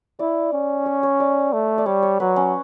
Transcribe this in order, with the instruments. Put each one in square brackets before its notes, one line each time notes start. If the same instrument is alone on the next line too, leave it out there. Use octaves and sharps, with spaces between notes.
[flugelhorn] E4 [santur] D5
[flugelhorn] C#4
[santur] C#5
C#5
D5
[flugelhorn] A3
[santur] D5
[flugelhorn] G3 [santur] C#5
[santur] C#5
[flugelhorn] F#3 [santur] B4
[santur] C#4